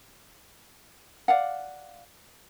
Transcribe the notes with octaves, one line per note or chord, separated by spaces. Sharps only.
D5 F5 F#5